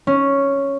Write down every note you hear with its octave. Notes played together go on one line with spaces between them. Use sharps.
C#4